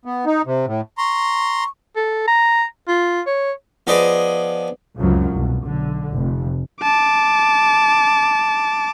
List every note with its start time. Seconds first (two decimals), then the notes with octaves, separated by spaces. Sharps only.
0.05 B3
0.26 D#4
0.46 C3
0.66 A2
0.98 A#5 C6 C#6
1.96 A4
2.27 A#5
2.88 F4
3.27 C#5
3.87 F3 B3 G#4 D5 D#5
5.00 F1 C#2 F#2 C#3 F3 F#3
5.35 C2 B2
5.65 B1 D3
6.14 F1 F2
6.82 A5 D6